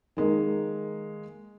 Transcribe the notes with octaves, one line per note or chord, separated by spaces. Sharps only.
D#3 G#3 A#3